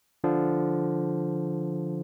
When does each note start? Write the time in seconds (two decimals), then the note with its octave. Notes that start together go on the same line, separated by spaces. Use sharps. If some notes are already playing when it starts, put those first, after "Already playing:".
0.24 D3 F3